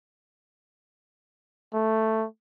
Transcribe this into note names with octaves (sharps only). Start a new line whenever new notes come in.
A3